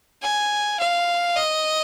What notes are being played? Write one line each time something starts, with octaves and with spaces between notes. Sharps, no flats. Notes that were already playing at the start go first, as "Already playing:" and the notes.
G#5
F5
D#5